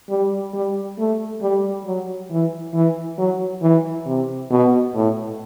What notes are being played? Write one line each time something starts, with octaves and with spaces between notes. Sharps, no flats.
G3
G3
A3
G3
F#3
E3
E3
F#3
E3
C3
B2
A2